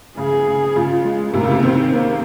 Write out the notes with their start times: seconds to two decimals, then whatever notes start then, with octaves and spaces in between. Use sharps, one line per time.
0.17 C#3 G#4
0.47 C#3
0.76 C#3 F4
1.05 G#3
1.34 C3 A#3
1.43 C#3
1.51 C3
1.63 D#3 C4
1.93 A#3